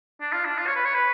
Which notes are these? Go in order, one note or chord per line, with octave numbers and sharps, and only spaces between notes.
D4
F4
D4
F4
C#5
B4
C#5
B4